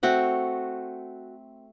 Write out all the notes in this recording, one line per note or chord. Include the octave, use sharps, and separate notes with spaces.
A3 C4 F#4 F#5